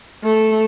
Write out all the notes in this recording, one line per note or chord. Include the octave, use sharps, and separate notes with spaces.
A3